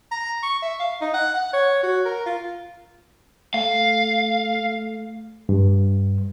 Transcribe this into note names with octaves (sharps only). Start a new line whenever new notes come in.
A#5
C#6
E5
F5
D#4
F#5
F#5
C#5
F#4
A#4
F4
A3 F5
G2